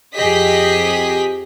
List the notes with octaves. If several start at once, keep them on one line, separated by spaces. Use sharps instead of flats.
F2 G4 G#4 D#5 B6